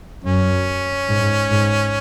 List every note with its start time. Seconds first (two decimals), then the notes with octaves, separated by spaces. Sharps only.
0.24 F#2 C#4
1.08 G#2
1.50 G#2